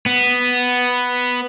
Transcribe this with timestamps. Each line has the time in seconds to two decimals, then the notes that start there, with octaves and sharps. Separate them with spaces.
0.06 B3